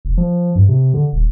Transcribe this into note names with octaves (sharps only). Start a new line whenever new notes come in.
F1
F3
G2
C3
D3
D#1